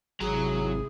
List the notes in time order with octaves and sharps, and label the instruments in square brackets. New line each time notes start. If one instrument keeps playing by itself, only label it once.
[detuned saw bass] G#1 [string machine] C3 E4 [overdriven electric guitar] F#3 A#5 [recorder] G#4